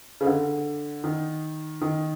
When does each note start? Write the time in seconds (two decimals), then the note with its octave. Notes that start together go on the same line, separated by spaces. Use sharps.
0.21 C#3
0.26 D3
1.04 D#3
1.81 D#3